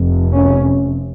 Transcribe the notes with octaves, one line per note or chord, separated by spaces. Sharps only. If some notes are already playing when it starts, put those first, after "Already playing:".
Already playing: F1 F2 C3
C#4